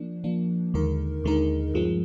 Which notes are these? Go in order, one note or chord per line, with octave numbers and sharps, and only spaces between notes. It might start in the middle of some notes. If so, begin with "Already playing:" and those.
Already playing: F3 A#3 D4
F3 A#3 D4
D#2 D3 G#3 D#4 A#4
D#2 D3 G#3 D#4 A#4
G2 F3 G#3 C4